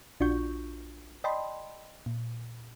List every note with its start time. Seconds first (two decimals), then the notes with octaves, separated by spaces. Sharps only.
0.20 A#1 D4 F4 F#4 C#6 G6
1.24 D5 D#5 G5 A5 B5 C6
2.06 A#2